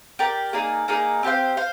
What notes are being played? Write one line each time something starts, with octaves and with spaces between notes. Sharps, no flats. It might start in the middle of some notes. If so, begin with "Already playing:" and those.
G4 A#4 D5
A#3 D#4 G#4 D5
A#3 D#4 G#4 D5
C4 G4 C5 F5
C5 F5